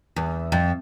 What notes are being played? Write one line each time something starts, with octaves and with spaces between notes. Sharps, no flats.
E2
F2